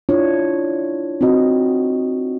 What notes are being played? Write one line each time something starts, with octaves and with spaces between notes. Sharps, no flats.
D4 E4 F4 C#5
C4 D#4 F#4 D#5